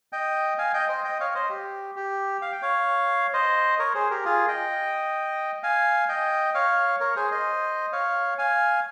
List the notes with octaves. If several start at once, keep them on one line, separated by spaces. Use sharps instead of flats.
D#5 G5
F5 G#5
D#5 G5
C5 D#5
D#5 G5
C#5 F5
C5 D#5
G4
G4
F5
G5
C#5 F5
C5 D#5
A#4 C#5
G#4 C5
G4 A#4
F4 G#4
D#5 G5
F5 G#5
D#5 G5
C#5 F5
A#4 C#5
G#4 C5
C5 D#5
C#5 F5
F5 G#5